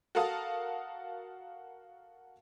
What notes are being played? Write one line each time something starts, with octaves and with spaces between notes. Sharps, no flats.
F#4 A4 A#4 F5 A5 D#6